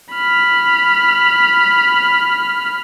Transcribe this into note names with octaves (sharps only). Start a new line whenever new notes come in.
B5 F6